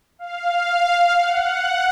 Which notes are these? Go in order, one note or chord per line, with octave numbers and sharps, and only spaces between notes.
F5
F#5